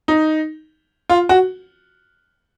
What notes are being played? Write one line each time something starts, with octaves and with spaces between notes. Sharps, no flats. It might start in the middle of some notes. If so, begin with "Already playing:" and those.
D#4
F4
F#4